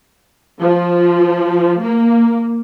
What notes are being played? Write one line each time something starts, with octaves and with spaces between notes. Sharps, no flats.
F3
A#3